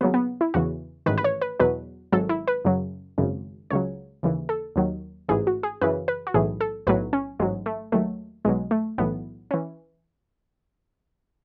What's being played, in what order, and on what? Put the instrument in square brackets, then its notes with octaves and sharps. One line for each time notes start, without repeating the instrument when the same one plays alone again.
[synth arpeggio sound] D#2 C#3 F#3 B3
B3
E4
E2 C#3 E3 F#4
A1 G#2 D#3 B4
B4
C#5
B4
E2 B2 F#3 B4
G#1 G#2 F#3 A4
E4
B4
F#2 C#3 F#3
G#1 F#2 C#3
C#2 C#3 F#3 C#5
D#2 C#3 E3
A4
D#2 D#3 F#3
A1 G#2 E3 G#4
F#4
G#4
F#2 C#3 E3 B4
B4
F#4
B1 A2 E3 G#4
A4
B1 A2 F#3 B4
C#4
A1 G#2 F#3 G#3
A3
D#2 D#3 F#3 A3
B1 B2 F#3 G#3
A3
B1 A2 E3 B3
E3 C#4